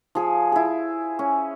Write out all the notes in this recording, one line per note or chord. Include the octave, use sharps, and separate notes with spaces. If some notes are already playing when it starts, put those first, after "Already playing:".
F3 G#4
E4 G#4
C#4